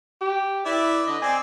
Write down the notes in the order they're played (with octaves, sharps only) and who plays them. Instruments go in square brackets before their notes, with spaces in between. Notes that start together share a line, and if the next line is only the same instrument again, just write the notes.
[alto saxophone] G4
[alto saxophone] E4 [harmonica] B4 D5 E5
[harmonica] D3 [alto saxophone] D#5
[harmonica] C4 D5 [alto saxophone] G#5